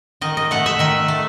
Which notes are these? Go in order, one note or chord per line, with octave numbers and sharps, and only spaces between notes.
D#3 D#5
D#5
A3 F#5
E5
D#3 E5
A3